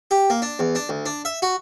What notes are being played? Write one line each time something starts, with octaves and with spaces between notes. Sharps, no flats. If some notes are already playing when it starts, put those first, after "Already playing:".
G4
A#3
D4
E2
D4
D2
D4
E5
F#4